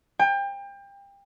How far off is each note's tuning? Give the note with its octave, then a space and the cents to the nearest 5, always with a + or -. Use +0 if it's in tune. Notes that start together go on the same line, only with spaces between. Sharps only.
G5 +30